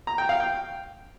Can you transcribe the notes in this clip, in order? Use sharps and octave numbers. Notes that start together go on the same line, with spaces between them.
A#5
G5
F5
G5